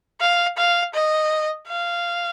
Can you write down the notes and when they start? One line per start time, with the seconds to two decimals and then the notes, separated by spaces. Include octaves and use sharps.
0.21 F5
0.57 F5
0.94 D#5
1.68 F5